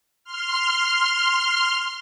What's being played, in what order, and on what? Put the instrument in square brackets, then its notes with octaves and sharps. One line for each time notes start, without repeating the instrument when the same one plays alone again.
[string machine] C6 F6